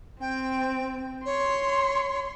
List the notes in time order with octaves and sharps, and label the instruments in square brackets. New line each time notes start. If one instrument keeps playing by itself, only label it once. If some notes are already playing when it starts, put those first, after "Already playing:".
[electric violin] C4 [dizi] G5
[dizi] C#5 [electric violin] C6